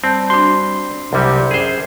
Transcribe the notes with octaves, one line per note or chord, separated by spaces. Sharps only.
G3 C4 A5 G6
D4 F#4 C6
C2 C3 F#3 G3
F#2 G#4 C5